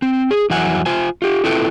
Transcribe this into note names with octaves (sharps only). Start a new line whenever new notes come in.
C4
G#4
F2 E3 F#3 E5 F#5 G#5
F4 C5 G#5
F4 G4
C4 E4 F4 A4 B4 G5